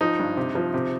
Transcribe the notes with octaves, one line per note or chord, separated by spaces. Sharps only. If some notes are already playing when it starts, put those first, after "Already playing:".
F3 D#4
G2
C3
F3
C3